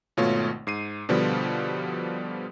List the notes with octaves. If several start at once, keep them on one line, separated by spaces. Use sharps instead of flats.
G#1 B2 A3 F4 C#5
G#2 C7 D#7
B2 D3 F3 G3 B3